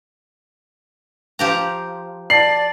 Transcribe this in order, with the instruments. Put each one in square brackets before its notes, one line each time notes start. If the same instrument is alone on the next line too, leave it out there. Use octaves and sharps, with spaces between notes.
[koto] F3 G4 A#5
[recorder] D5 [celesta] A5 F#7 [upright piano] C7